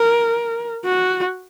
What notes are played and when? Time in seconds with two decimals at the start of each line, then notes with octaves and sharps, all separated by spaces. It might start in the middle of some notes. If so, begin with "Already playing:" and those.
Already playing: A#4
0.85 F#4